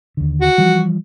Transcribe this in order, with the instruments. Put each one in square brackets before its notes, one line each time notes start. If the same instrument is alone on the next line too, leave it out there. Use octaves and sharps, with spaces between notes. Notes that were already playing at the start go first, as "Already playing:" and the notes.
[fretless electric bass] D#2 D3
[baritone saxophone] F#4
[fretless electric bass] E3 F3 G3